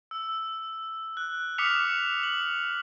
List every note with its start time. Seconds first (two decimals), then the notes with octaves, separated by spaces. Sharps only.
0.11 E6
1.17 F#6
1.58 D6 D#6 F6 B6 C#7 F7
2.23 F#7